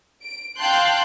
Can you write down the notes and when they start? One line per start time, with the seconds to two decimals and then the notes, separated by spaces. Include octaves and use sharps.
0.24 D7
0.58 F5 G5 A5 C6 F#6 G6